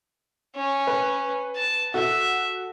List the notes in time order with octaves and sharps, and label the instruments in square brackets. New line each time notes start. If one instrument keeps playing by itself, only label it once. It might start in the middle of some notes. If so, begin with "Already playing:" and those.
[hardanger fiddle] C#4
[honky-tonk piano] B4
[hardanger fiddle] A5
[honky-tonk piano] F#4 A4 [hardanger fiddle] E5